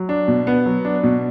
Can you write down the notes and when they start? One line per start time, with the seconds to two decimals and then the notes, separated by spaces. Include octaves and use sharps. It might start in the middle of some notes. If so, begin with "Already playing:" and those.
Already playing: F#3
0.09 D4
0.28 B2
0.47 B3
0.66 F#3
0.85 D4
1.04 B2